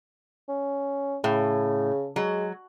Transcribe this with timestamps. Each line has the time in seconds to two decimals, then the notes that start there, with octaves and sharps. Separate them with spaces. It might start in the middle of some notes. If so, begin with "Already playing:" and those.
0.49 C#4
1.24 A2 C#3
2.16 F#3 G#3